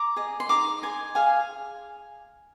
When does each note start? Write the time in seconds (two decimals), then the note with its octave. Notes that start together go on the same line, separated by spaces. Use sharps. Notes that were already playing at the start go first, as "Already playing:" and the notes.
Already playing: A#5 D6
0.16 G#4 D#5
0.40 C6
0.49 D#4 A#5 D6
0.82 G#4 D#5 G#5 C6
1.15 G#4 F5 G#5